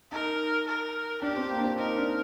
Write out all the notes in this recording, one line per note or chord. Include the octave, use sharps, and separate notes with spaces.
D#4 A#4
A#4
D4 G4
C4
A#3
D4
C4
D#4 A#4
D4